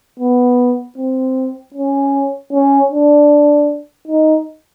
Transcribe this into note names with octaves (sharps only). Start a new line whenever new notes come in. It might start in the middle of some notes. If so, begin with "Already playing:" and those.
B3
C4
C#4
C#4
D4
D#4